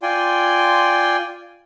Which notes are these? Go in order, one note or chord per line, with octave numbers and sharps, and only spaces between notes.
F4 D5 G5 G#5 C6